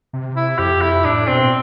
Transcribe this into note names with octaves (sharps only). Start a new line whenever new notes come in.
C3
E4
F2 G4
E4
A2 D4
B2 C4